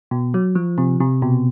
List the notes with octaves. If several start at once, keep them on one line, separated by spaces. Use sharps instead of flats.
B2
F#3
F3
C3
C3
B2